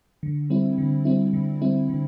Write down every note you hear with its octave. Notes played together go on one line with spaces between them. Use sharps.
D3
G3 C4 E4
D3
G3 C4 E4
D3
G3 C4 E4
D3